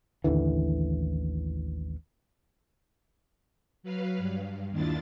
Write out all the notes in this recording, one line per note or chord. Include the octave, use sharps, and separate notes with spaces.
A1 D#2 D3 E3
F#3 B4 F5
G2
D#2 D#3 D4 E4 F4 A6